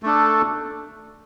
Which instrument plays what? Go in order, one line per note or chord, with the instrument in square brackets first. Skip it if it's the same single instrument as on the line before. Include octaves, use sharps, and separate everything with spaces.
[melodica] A3 D4 A4